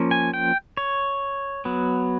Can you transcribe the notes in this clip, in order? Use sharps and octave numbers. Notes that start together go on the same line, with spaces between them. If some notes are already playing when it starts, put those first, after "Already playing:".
Already playing: F3 A#3 C#4
G#5
G5
C#5
F#3 B3